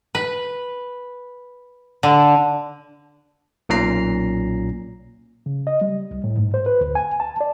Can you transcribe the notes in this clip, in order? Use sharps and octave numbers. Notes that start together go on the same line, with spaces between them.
B4
D3
B1 A#2 C#4 A#5 C7
C#3
D#5
G3
C2
A2
G#2
C5
B4
D2
G#5
A5
D5